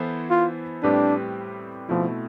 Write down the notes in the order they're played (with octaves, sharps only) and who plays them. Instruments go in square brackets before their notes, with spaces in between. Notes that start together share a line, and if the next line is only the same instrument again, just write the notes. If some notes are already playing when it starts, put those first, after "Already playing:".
Already playing: [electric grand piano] E3 B3 E4 A4 C5
[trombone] F4
[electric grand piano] A2 G3 C4 G4 B4 [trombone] D4
[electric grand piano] B2 A3 C4 E4 [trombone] F3